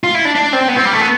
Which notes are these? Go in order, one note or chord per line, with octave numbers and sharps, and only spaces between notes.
F4
E4
D4
D4
C4
B3
C4
G3
A3
B3